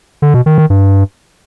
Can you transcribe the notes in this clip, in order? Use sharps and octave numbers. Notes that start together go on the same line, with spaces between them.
D3
B2
D#3
D#3
G2